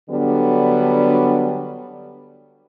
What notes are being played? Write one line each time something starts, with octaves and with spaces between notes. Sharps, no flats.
D3 F#3 G3 B3 D4